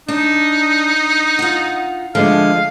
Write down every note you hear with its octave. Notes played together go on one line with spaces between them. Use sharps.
D4 D#4
F4 F#5
D3 F3 G#3 A3 F5